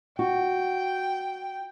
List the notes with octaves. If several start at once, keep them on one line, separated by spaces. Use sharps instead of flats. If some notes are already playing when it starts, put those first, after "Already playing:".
F#4 G5